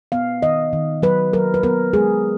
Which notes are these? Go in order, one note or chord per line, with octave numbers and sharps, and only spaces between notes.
B3 F5
D#3 D#5
D#3
F#3 B4
F#3 A#4
B4
B3 A#4
G#3 G#4